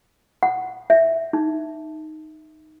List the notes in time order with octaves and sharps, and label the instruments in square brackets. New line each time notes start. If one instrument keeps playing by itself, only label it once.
[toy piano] F#5
E5
D#4